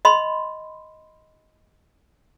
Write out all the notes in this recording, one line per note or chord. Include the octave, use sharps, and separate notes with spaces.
D#5 B5 C6